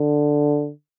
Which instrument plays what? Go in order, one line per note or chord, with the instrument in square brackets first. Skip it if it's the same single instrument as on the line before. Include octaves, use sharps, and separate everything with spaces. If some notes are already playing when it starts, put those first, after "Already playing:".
Already playing: [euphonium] D3